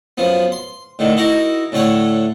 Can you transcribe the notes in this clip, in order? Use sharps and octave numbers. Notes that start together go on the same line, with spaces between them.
F#2 F3 B3
C6
A2 D3 D#3
D#4 E4 F#4 A#4
A2 D3 A3 C#5 F#5